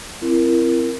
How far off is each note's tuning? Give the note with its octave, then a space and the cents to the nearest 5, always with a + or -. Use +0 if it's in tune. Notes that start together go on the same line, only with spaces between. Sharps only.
C4 +0 E4 +35 A#4 +0